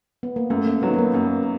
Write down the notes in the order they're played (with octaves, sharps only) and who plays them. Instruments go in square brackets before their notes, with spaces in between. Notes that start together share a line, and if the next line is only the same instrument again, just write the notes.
[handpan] B3
A#3
[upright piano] F#2 [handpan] A3
[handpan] A#3
[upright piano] D#3 F#3 [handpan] B3
[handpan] B3
A#3
[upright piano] F#2 [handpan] A#3